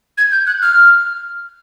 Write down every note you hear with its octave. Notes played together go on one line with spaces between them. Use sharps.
G#6
G6
F#6
F6